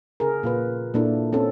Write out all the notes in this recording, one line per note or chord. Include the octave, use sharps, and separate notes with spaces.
C#3 G#4 A#4
A#2 F4 B4
A#2 A#3 D4 E4 A4
C4 C#4 A4